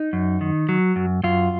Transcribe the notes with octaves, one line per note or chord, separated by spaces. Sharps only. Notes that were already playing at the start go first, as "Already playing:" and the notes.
Already playing: D#4
F#2
D#3
F#3
F#2
F#2 F4